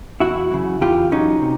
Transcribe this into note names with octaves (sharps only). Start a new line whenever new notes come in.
E2 E4 F#4
C#3 F#3
E2 F4 G4
C#3 F#3 C#4 D#4
C3